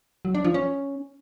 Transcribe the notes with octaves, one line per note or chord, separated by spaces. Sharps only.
F#3
D4
F3
C#4